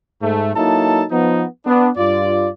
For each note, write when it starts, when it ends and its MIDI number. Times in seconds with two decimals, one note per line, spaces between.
0.22 0.54 44
0.22 0.54 57
0.55 1.04 54
0.55 1.04 58
0.55 1.04 63
0.55 1.04 64
0.55 1.04 69
0.55 1.04 81
1.11 1.45 53
1.11 1.45 59
1.11 1.45 63
1.66 1.88 59
1.66 1.88 62
1.97 2.48 43
1.97 2.48 65
1.97 2.48 74